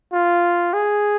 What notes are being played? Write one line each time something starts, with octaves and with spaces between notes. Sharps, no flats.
F4
G#4